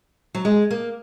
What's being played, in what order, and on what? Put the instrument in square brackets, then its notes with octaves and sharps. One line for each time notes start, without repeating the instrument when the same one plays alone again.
[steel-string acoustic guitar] F#3
G#3
A#3